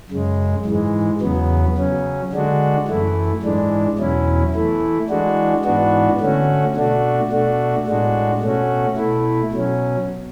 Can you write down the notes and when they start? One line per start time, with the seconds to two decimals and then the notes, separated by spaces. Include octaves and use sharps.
0.10 F#2 C#3 G#3
0.66 G#2 E3 G#3
1.21 E2 C#3 F#3 B3
1.77 C#3 F#3 C#4
2.33 D3 G#3 D4 F#4
2.88 F#2 E3 A3 E4
3.43 G#2 E3 G#3 D4
3.99 E2 B2 F#3 C#4 E4
4.54 E3 A3 E4
5.10 E3 G#3 D4 F#4
5.64 G#2 E3 B3 D4 F#4
6.21 D3 A3 C#4 F#4
6.76 B2 A3 D4 F#4
7.31 B2 A3 D4 F#4
7.86 A2 G#3 D4 F#4
8.41 B2 A3 C#4 F#4
8.97 B2 A3 E4
9.52 B2 F#3 C#4